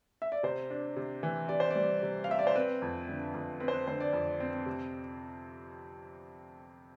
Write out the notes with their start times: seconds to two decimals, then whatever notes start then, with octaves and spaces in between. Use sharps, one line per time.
0.22 E5
0.32 D5
0.43 C3 C5
0.70 D4
0.96 C3
1.23 E3
1.49 C3 D5
1.60 C5
1.70 G3 D5
2.02 C3
2.24 F5
2.29 C3 E5
2.39 D5
2.47 C5
2.55 C4 B4
2.82 F2
3.08 D3
3.34 F2
3.60 C4 B4
3.68 C5
3.74 B4
3.88 D3 C5
4.00 D5
4.13 F2
4.40 C4
4.66 C3